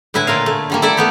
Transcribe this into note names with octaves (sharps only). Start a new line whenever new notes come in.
A2 D3 E4 B4 G#5
A#2 F4 A#4 F5
A3
D3 G3 A#3
E4 A4 D5 E5
A3 B3 G4